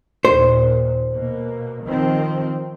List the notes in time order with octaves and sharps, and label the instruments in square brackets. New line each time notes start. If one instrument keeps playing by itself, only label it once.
[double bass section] D#2 A#2 [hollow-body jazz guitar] C5
[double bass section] B2 A#3
D#3 F3 C4